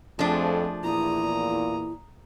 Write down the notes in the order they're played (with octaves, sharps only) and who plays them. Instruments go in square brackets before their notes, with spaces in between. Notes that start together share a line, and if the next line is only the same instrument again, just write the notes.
[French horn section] F2 [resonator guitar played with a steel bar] F3 D4 [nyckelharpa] A3 G#4
[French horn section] E2 A#2 [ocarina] E4 [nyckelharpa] A#5 D#6